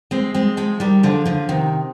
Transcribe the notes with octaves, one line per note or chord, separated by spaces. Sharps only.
G#3 C4
G#3 C4
F3 G#3
D#3 G3
D3 F3
D3 F3
C3 D#3